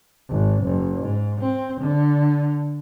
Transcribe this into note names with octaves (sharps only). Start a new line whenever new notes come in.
G#1
F#1
G#2
C4
D3